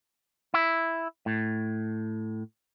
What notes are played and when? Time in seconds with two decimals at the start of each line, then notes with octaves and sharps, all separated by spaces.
0.54 E4
1.26 A2